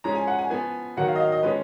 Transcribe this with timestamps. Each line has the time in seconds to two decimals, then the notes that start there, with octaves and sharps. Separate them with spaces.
0.04 F3 G#3 C#4 A#5
0.15 G#5
0.27 F#5
0.38 G#5
0.50 F3 B3 G#5
0.97 D#3 F#3 A#3 F#5
1.08 F5
1.16 D#5
1.20 F5
1.32 D#5
1.43 F3 G#3 C#4 B4